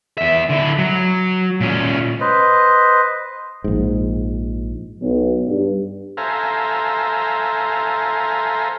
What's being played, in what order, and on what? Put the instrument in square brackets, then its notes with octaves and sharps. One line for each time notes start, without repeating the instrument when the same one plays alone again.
[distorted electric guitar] E2 E5
D3 E4
F#3
A#2 C#4
[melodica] B4 C5 D#5
[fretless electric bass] A#1 G#2
[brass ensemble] B1
G2
[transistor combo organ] A4 C5 E5 F5 G#5 A#5